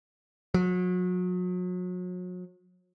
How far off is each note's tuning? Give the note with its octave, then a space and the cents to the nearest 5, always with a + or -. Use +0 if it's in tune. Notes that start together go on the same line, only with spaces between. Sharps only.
F#3 -35